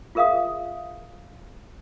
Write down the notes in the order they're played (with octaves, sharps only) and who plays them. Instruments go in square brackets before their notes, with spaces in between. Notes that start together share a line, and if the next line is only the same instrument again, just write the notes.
[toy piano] F4 G#4 A#4 E5 F5 D#6